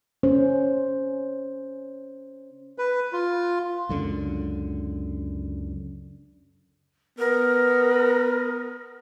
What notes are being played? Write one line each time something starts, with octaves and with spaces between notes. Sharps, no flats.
C#4 C5
B4
F4
C#2 F#2 D3
B3 A#4